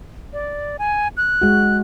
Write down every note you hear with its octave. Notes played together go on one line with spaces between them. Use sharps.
D5
G#5
F#6
G#3 F#4